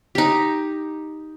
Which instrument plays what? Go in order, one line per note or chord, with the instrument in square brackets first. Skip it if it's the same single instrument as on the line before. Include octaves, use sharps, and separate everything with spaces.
[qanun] D#4 G4